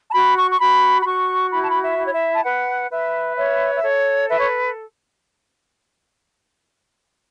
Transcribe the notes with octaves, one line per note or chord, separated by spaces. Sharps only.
A5
F#4 B5
C#6
C#6
F#4 B5
B5
F#4 C#6
E4 B5
A5
B5
E5
E4
C#5
E5
A5
B4 F#5
B4 E5
C#5 E5
E5
A4 C#5
B4 E5
C#5